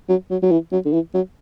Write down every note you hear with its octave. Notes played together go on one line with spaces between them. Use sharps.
F#3
F#3
F#3
E3
F#3
D3
E3
F#3